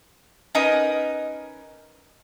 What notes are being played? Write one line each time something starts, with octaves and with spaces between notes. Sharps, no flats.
C#4 D#4 A#4 B4 D#5